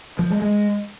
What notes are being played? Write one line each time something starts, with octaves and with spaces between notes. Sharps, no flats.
F3
G#3
G#3